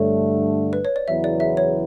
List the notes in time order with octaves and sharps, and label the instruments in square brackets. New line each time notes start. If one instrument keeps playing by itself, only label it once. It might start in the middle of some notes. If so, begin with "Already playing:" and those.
Already playing: [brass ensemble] G2 D3 A3 [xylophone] C#5
[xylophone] B4
C#5
D5
[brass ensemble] E2 C#3 F#3 B3 E4 [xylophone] E5
[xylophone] D5
E5
C#5